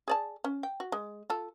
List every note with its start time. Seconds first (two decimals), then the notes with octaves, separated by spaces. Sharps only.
0.08 G#4 D5 A5
0.44 C#4
0.63 G5
0.80 F#4
0.92 G#3
1.30 F4 A4